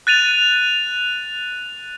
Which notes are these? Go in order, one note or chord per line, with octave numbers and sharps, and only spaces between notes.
F#6 A6 D#7 F7